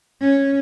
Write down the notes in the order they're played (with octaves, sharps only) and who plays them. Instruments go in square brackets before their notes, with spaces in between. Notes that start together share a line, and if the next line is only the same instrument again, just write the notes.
[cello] C#4